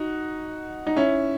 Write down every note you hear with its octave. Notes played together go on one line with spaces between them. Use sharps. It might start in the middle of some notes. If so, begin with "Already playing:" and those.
Already playing: D#4 F#4
D#4
C#4 E4